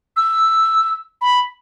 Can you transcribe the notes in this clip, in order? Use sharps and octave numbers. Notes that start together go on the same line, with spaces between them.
E6
B5